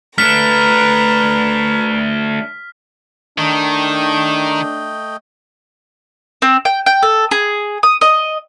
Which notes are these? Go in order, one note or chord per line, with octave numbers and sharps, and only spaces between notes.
A3 D4 B4 A#5 F6 B6
D#3 A3 D4 D#5 G5
C4
G5
G5
A4
G#4
D#6
D#5